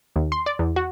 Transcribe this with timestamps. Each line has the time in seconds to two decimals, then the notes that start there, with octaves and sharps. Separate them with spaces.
0.16 D#2
0.32 C6
0.46 D5
0.59 E2
0.76 F#4